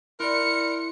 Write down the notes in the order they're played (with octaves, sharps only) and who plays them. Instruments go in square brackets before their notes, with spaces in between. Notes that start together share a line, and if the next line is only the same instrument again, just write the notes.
[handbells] E4 C6 F#6 [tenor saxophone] A#4 [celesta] D5 B5 [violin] C#7